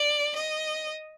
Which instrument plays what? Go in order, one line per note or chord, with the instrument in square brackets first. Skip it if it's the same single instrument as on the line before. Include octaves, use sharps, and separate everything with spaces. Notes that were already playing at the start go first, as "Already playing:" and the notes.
Already playing: [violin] D5
D#5